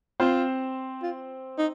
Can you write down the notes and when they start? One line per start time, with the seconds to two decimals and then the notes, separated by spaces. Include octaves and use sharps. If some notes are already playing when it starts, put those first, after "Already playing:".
0.20 C4 F4 C5
1.03 F4
1.58 D#4